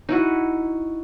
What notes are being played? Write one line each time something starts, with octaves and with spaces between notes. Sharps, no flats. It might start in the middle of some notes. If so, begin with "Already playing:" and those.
D#4 E4 F#4